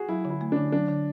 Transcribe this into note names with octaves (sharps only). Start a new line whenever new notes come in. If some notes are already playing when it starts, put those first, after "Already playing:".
Already playing: F#4 G#4
F#3 E4
D3
E4
A3
D3 D4
F#3 D4
D3